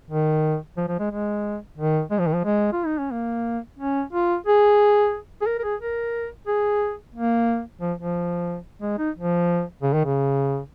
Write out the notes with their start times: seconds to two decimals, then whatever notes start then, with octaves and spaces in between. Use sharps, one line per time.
0.10 D#3
0.77 F3
0.88 F3
0.99 G#3
1.10 G#3
1.78 D#3
2.11 G#3
2.19 F3
2.27 D#3
2.34 F3
2.45 G#3
2.72 F4
2.86 D#4
2.98 C#4
3.12 A#3
3.79 C#4
4.13 F4
4.46 G#4
5.41 G#4
5.46 A#4
5.59 A#4
5.63 G#4
5.80 A#4
6.47 G#4
7.14 A#3
7.81 F3
7.98 F3
8.82 G#3
8.98 D#4
9.15 F3
9.82 C#3
9.93 D#3
10.05 C#3